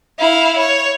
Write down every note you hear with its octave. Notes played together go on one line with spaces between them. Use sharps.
E4 F5
C#5